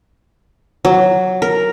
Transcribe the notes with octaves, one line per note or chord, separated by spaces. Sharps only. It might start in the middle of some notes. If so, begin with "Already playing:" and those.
F#3
A#4